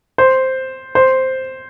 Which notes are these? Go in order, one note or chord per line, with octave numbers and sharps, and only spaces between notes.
C5
C5